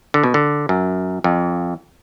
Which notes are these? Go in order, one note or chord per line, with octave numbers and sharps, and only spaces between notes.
D3
B2
D3
F#2
F2